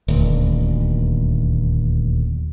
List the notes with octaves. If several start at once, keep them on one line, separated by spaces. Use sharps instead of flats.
D#1 D2